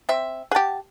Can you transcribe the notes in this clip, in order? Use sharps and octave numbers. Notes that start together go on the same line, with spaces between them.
C4 E5
G4 G#4 F#5 A5